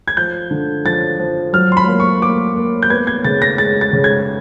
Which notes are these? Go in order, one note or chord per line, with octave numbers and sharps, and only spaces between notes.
G#6
F3 G6
D3
F3 A6
F3
F#3 F6
C6
B5
A#3
C#6
A#3 D6
A#3
G6
B3 G#6
G#6
C#3 A6
A#6
G#3 A6
A6
C#3
G#6